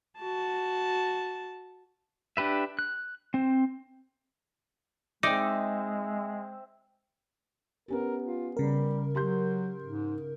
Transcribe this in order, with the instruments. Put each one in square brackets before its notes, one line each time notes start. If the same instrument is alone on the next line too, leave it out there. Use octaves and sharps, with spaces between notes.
[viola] F#4 A5
[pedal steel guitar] D4 G4 B4 E5
F#6
C4 C5
[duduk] G#3 [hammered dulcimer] C4 E5 [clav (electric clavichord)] D#4 [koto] D5
[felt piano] B3 C#4 G4 [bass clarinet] A#4
[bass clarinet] F4
[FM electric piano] C#3 A#4 [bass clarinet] G3
[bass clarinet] F#3 [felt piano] G4 C6 G6
[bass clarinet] G#2